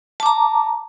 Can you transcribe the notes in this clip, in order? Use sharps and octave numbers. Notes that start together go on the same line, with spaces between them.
A5 A#5 D6